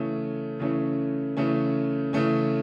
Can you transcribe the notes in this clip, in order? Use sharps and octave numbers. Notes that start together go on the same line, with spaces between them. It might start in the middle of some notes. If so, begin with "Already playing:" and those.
Already playing: C#3 E3 A3 C#4
C#3 E3 A3 C#4
C#3 E3 A3 C#4
C#3 E3 A3 C#4